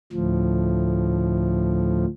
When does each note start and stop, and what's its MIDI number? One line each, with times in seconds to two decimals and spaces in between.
0.13 2.06 38
0.13 2.06 45
0.13 2.06 53